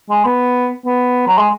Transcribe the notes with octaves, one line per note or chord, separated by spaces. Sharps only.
G#3
B3
B3
F#3
G#3